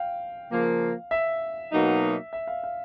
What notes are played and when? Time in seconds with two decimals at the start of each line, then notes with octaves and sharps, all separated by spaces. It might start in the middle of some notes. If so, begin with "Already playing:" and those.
Already playing: F5 G5
0.50 C#3 F3 A#3
1.11 E5
1.72 B2 F#3 A#3 D#4
2.33 E5
2.47 F5
2.63 F5